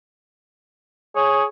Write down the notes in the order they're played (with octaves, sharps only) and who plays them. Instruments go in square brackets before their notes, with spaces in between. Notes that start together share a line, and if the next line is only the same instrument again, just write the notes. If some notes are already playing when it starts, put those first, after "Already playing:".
[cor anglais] G#4 [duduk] C#5